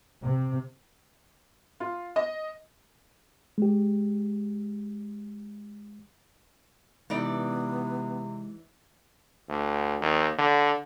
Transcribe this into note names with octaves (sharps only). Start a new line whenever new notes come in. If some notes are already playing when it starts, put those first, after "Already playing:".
C3
F4
D#5
G#3 G4
C3 E3 G#3 B3 D#4 D5
D2
D#2
D3